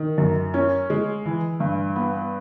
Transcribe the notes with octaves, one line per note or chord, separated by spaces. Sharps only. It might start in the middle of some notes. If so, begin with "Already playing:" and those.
Already playing: D#3
F#2
C#4
G#3
E3
G2
B3